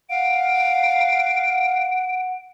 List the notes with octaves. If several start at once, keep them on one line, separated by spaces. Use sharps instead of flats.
F5 F#5 D7